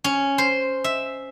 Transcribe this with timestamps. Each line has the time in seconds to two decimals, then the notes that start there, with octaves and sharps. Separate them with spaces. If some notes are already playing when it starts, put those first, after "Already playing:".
0.04 C#4
0.38 C5
0.84 E5